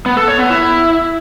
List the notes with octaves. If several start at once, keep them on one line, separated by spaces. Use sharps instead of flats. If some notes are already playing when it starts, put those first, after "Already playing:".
B3
A4
C#5
B3
E4